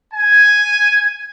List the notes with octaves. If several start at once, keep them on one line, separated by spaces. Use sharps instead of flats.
G#5